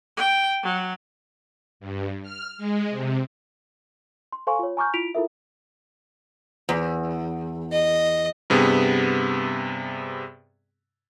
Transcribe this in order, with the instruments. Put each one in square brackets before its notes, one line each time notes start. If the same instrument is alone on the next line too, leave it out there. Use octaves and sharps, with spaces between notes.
[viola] G5
F#3
[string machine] G2
F6
G#3
C3
[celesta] C6
A4 C5 F5 G#5 C6 C#6
F4 C#5
G#5 A#5 C#6 D6 F6 G6
E4 F4 B6 D7 F7
E4 F4 A4 A#4 E5
[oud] E2
[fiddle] D#5
[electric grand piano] G2 C3 B3 G#4